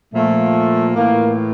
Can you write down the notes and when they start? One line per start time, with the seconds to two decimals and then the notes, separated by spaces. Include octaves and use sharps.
0.14 A#2 F3 A3
0.96 A2 E3 A#3